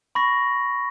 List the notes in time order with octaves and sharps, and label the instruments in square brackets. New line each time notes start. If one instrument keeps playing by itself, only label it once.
[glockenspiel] B5 C#6 A#6